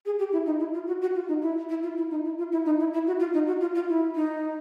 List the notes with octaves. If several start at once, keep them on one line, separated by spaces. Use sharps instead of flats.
G#4
G4
E4
D#4
E4
F4
F#4
F#4
F4
D#4
E4
E4
F4
E4
D#4
E4
F4
E4
D#4
E4
E4
F#4
F4
D#4
F#4
F4
F4
E4
D#4